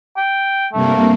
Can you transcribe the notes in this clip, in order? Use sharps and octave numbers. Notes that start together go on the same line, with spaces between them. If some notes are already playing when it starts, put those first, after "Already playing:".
G5
G2 C3 A3 A#3